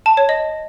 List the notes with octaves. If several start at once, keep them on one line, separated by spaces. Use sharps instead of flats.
A5
C#5
D#5